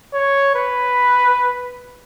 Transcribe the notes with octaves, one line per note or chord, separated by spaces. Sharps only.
C#5
B4